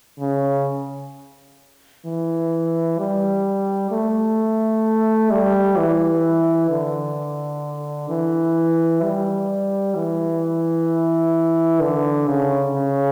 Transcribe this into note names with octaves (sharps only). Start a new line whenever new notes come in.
C#3
E3
G3
A3
G3
E3
D3
E3
G3
E3
D3
C#3
C#3